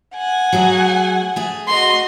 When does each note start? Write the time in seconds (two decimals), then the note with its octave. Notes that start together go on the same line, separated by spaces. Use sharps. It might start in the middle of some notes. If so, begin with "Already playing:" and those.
0.15 F#5 G#5
0.52 F#3 A3 G#4
1.36 A3 G#4
1.68 F#4 D#5 C6